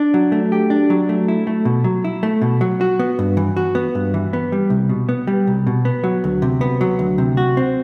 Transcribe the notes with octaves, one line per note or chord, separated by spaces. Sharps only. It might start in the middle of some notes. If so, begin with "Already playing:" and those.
Already playing: D4
F#3
A3
G4
D4
F#3
A3
E4
A3
B2
F#3
E4
A3
B2
F#3
F#4
B3
G2
E3
F#4
B3
G2
E3
B3
G3
C2
B2
B3
G3
C2
B2
B3
F#3
D2
C3
B3
F#3
D2
C3
F#4
C4